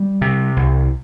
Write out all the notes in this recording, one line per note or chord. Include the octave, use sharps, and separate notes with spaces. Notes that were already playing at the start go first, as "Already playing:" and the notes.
Already playing: G3
C3
C2